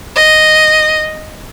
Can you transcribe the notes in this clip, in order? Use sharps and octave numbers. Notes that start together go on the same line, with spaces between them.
D#5